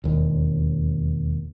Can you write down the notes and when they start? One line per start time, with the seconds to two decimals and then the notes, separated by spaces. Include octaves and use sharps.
0.04 E1 D#2